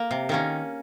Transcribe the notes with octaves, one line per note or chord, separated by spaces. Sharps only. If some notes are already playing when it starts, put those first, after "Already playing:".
Already playing: A#3
C3
D#3 A#3 C#4